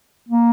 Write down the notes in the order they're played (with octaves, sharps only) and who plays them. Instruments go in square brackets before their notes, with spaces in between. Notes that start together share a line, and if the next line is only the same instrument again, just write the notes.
[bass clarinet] A#3